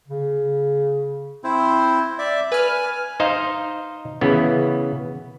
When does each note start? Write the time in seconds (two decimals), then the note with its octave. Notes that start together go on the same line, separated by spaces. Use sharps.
0.08 C#3
1.44 C4 E4 C5
2.18 D5 E5
2.52 B4 G#5 F6
3.20 D#4 C5 D#5 F5
4.21 C#3 E3 B3